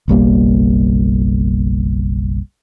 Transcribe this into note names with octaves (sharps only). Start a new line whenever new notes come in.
F#1 B1 G3 A#3